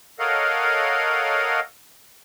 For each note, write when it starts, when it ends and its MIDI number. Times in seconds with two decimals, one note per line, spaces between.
0.19 1.60 69
0.19 1.60 70
0.19 1.60 73
0.19 1.60 75
0.19 1.60 77
0.19 1.60 78